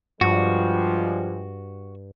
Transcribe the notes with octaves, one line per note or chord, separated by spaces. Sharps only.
G2 F3 G3 G#3 F#4